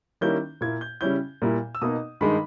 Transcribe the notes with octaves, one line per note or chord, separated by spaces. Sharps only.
D#3 G3 A#3 C#4 E4 G6
A#2 A#3 E4 G#6
G6
C#3 G3 C#4 E4 G6
A#2 G3 A#3 E4
E6
B2 A#3 D#4 D#6
G2 D#3 G#3 D#4 B5